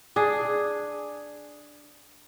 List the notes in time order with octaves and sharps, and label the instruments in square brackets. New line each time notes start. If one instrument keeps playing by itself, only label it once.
[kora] D4 G#4